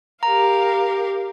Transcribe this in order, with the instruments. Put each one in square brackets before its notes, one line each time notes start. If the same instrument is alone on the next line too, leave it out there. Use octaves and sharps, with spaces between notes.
[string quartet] G4 A#4 F5 [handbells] A#5